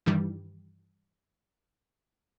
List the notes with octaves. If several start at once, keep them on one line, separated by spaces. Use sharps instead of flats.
G2 D#3 E3 G3